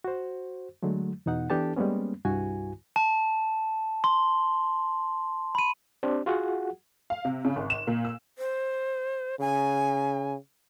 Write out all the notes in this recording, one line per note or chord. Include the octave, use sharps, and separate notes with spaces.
F#4 C5
D3 F#3 G#3 A3
E2 B2 D#4 F#5
E3 B3 D4 G4 A4 A5
G3 G#3 A#3 B3 C#4
C2 G2 E4 F#4 G#5
A5
C6
B5 D#7
C4 D4 G4
F4 F#4 G#4 F#5
F5
C3
C#3
G#1
E7
A#2
E6
C5
C#3 G#5